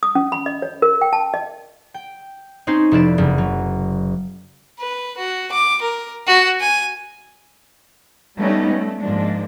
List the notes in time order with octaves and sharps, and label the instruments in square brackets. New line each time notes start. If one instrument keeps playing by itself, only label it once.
[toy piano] D#6
C#4
B5
D#5
C#5
A#4
G5
A5
D#5
[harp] G5
C4 C#4 D#4 C5
F1 E4 B4 D5 E7
F#1
F#3
[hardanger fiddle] B4
F#4
D6
A#4
F#4
G#5
[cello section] G3 A3 B3 C#4 D#4
A3
G#2 F3 G#3 A#3 D4